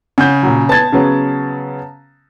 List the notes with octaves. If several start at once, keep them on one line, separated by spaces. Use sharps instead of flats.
C#3 F#5 G6
A#2 F#3
B3 A5 G#6 A6
C#3 F#3 B3